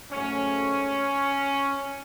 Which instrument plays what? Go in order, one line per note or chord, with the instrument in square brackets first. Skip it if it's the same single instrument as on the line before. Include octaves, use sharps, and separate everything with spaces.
[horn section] G#2 F#3 A3 C#4